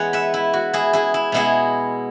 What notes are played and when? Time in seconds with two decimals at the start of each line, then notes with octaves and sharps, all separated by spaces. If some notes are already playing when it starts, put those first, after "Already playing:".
Already playing: E3 G#3 B3 C#5 F#5 G#5
0.13 B4 E5
0.34 E4
0.53 F#4
0.73 E4 G#4
0.93 E4 G#4
1.14 E4
1.32 B2 G#3 B3 E4 G#4